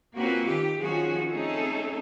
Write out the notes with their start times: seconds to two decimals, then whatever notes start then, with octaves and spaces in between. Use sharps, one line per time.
0.16 A#3 C4 C#4 F4 F#4 B4
0.46 D#3 G4
0.79 D#3 F3 C#4 F#4 G#4
1.31 A3 C4 C#4 D#4 G#4 A4